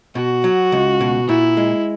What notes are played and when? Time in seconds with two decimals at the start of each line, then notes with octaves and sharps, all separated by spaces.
0.15 B2 F#4
0.44 F#3
0.72 C#2
1.01 B2
1.28 A#2 E4
1.57 G#3